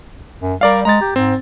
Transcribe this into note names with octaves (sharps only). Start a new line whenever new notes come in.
F#2
G3 A#4 D5 F5
G#3 A#5 A6
G4
G#2 C4